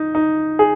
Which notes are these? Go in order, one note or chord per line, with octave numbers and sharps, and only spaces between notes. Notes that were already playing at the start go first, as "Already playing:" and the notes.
Already playing: D#4
D#4
G#4